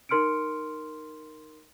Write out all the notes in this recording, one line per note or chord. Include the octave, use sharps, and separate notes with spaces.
D#4 A#4 C6 F6 C#7 D7